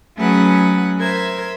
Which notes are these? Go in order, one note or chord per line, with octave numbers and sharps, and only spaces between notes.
F#3 A3 C#4 G#4 B4 F#5
A#4 C5 E5 G#6